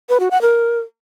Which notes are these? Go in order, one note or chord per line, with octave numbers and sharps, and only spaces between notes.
B4
F#4
F#5
A#4